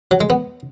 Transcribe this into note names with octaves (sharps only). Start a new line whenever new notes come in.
F#3
G#3
B3